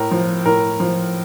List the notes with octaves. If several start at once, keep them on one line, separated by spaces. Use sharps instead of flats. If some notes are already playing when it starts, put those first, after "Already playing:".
Already playing: A2 A#4
F3
A2 A#4
F3